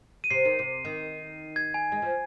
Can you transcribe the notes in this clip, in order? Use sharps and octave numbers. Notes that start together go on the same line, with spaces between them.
D#7
C3 C7
D#3
C3
D#3
G#6
G#5
G#3
F3